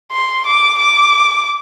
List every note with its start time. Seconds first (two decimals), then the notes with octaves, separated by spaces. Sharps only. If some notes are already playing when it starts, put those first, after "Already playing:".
0.12 C6
0.46 D6
0.78 D6